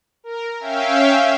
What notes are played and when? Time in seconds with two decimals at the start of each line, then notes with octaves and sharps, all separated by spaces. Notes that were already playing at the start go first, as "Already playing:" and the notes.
0.24 A#4
0.60 C#4 E5 F5 G5